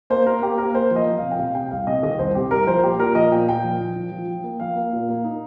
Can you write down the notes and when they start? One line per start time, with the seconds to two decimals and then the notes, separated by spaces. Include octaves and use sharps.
0.10 A#3 C5
0.26 A#3 A#4
0.42 A#3 G4
0.58 A#3 A#4
0.74 A#3 C5
0.91 F3
0.96 D#5
1.06 F3
1.18 C3 F5
1.31 G5
1.38 C3 F5
1.55 C3 G5
1.71 C2 F5
1.87 C3 D#5
2.03 D#3 D#5
2.18 C2 C5
2.35 C3 G4
2.51 C2 A#4
2.67 F3 C5
2.83 A#2 G4
2.99 A#2 A#4
3.15 F3 D#5
3.31 A#2 G5
3.48 A#2 G5
3.64 F3
3.80 F3
3.96 F3
4.12 F3
4.28 F3
4.44 A#3
4.60 F3 F5
4.76 A#3
4.93 A#2
5.09 A#3
5.24 D#4